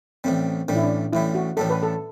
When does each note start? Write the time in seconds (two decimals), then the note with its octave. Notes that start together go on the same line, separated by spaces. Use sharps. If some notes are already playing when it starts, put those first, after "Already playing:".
0.24 A1 A2 G3 C4
0.68 A1 A2 G3 D4
0.76 E4
0.83 D4
1.13 A1 A2 G3 E4
1.35 F#4
1.57 A1 A2 G3 A4
1.70 B4
1.83 A4